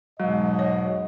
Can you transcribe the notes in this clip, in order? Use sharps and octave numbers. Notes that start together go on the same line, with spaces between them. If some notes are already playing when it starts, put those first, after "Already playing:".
E2 G#2 B2 F#3 G#3 D#5
C#5